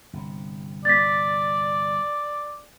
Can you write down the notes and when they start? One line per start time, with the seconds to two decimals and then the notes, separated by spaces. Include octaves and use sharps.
0.13 G1 C3
0.85 D5 A6 B6